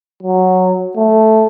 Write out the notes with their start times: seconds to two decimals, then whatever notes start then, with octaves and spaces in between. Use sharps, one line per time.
0.23 F#3
0.96 A3